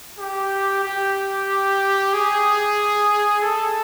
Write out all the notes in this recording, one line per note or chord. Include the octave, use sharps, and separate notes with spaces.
G4
G4
G#4
A4